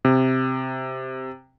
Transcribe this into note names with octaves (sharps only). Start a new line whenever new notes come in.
C3